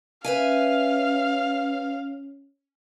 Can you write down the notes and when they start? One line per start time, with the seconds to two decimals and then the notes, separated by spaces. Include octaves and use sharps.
0.24 C#4 B4 E5 F5 G#5